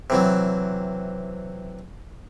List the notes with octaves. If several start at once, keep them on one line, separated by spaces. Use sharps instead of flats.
C3 E3 F#3